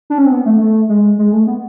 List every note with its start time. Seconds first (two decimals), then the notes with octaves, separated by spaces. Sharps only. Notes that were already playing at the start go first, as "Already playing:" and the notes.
0.10 D4
0.18 C#4
0.25 C4
0.32 B3
0.46 A3
0.61 A3
0.89 G#3
1.19 G#3
1.33 A3
1.47 B3